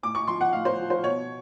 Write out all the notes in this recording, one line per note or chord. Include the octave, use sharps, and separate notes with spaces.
A2 D6
C#6
F3 C6
F#5
A2 F5
C5
F3
C5
B2 C#5